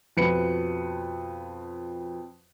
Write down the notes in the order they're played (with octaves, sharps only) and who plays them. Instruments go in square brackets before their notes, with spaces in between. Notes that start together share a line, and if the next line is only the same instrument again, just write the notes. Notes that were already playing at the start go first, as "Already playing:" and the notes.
[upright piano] F2 B2 F3 B4 C#7